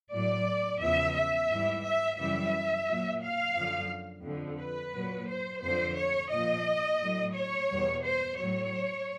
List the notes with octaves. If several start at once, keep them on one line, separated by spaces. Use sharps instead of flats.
A2 F#3 D5
E2 C#3 F3 E5
E5
G#2 E3 G3
E5
F#2 C#3 E3 G3 E5
A#2 F#3
F5
F#2 D3 F3
F2 D3 F3
B4
A#2 F#3
C5
F2 D3 F3 C5
C#5
A#2 F3 D#5
A2 F#3
C#5
E2 B2 G3
C5
A2 F#3 C#5